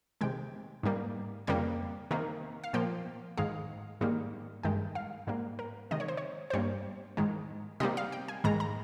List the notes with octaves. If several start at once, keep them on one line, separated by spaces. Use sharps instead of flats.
C3 D#3 G#3 G5
G#2 G3 A#3
F2 C#3 G3 A#3 G5
C3 D#3 A#3
F5
A#2 F3 A#3 G5
G#2 D#3 G#3 F5
G#2 D#3 G3 A#3
G2 D#3 G#3 G5
F5
G#2 G3 A#3
A#4
C3 D#3 G#3 D#5
C#5
C5
C#5
C5
G2 G3 A#3 C#5
G#2 D#3 G#3
C3 D#3 G3 A#3 D#5
F5
G5
G#5
G#2 D#3 G#3 A#5
A#5